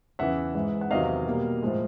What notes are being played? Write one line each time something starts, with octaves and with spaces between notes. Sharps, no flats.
E2 C#3 E3 E5 F#5
G#2 E3 G#3
F#5
E2 C3 D#3 F#3 D#5 F5
B2 G3 A#3
A2 F3 G#3